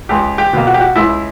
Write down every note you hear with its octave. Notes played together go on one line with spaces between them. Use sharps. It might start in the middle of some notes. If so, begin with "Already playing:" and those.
C#2 G4
G4
B2 A#3
F#4
G4
F#4
C#2 E4